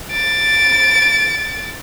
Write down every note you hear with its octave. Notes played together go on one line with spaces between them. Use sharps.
A6 D7